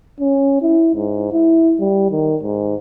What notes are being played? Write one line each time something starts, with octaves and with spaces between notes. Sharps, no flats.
C#4
E4
G#2
E4
G3
D#3
G#2